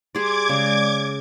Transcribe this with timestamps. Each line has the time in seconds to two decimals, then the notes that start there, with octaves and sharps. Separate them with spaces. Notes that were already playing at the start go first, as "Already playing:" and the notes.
0.15 G3 G#4 D5 C6 D6 G#6
0.49 C#3 G#3 D5